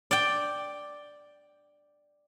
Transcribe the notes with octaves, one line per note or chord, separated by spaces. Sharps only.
D5 G5